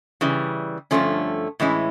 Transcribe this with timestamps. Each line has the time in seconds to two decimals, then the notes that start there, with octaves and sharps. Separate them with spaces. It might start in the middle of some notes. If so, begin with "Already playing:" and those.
0.21 C#3 E3 G3
0.91 G2 D3 F3 A3 C#4
1.60 A2 E3 G#3 C#4 E4